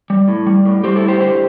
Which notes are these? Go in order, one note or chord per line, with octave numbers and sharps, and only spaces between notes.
G3
A2
G3
A2
G3 G4 C5
E4 A4
A2
G4 C5
D3 G4 C5